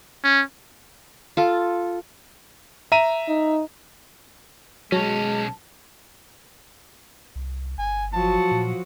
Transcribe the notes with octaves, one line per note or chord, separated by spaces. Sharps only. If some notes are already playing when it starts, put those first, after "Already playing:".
C#4
F4 A4
E5 A#5 D#7
D#4
B1 F#3 G#3 C#4 A5
C2
G1 G#5
F3 F#3 F#4 A5
A#2